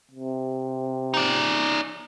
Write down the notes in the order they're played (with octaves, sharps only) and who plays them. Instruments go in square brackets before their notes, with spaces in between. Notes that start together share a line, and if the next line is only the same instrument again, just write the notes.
[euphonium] C3
[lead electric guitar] D#4 D5